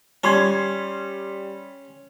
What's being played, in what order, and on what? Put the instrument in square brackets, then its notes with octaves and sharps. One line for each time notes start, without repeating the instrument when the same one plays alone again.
[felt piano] G3 C6 G#6 [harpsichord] C#4